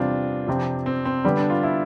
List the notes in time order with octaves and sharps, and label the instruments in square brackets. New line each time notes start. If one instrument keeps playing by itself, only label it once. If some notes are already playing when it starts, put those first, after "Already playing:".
Already playing: [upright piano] E2 C3 G3 C4 [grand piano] D4 F4
[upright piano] F2 C3 F3 C4
[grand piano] C4
C4
[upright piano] D3 G3 B3
[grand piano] D4
F4
E4